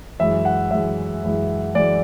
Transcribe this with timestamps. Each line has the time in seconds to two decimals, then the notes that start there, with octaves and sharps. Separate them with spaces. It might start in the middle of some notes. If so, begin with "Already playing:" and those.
0.19 F#2 E3 G#3 E5
0.45 F#5
0.71 F#2 E3 G#3 E5
1.23 F#2 E3 G#3
1.75 F#2 E3 G#3 D5